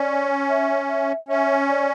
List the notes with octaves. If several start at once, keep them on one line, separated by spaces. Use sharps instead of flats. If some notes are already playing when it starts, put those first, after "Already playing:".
Already playing: C#4 D5
E5
E5
C#4 E5
D5